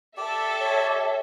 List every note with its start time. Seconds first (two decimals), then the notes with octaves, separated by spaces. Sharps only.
0.17 G4 A4 D5 E5
0.60 C#5